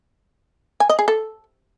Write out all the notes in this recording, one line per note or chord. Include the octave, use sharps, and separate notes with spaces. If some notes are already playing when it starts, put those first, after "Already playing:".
G#5
D#5
G#4
A4